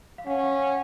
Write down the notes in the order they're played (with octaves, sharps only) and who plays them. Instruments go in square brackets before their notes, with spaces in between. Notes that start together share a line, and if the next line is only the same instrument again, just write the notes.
[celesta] F5
[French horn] C#4 [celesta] F#5
[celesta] F5
F#5